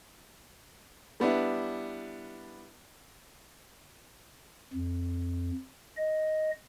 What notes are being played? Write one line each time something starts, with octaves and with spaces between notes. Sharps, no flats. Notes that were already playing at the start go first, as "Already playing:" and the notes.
G3 B3 D4 E4
F2
D#5